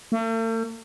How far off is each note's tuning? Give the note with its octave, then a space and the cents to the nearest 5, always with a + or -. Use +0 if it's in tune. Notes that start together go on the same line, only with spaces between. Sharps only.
A3 +45